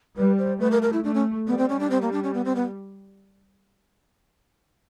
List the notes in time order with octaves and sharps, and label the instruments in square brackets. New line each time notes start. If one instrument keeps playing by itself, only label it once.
[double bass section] G3 [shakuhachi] B4
[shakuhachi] C5
[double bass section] A3 [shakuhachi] B4
[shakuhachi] A#4
A#4
E4
[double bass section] A3 [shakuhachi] D4
[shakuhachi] C#4
[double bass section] G3 [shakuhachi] B3
[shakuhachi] C4
C#4
D4
C4
A#3
D4
C#4
B3
C4
B3